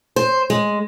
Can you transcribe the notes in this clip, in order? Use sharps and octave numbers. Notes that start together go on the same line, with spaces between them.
C5
G#3